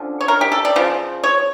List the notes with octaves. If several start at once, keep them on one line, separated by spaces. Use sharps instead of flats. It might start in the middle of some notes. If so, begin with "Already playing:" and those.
Already playing: D3 F3 C#4
C#5
A#4
G4
A4
D5
C#3 F3
C#5